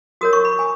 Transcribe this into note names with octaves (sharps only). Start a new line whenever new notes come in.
F#4 A#4 C#5 D#6
C#6
B5
G#5